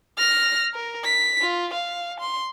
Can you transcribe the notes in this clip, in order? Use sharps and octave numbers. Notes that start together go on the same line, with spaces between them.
F6 A#6
A#4
B6
F4
F5
C6